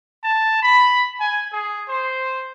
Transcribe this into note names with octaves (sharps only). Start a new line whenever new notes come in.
A5
B5
G#5
G#4
C5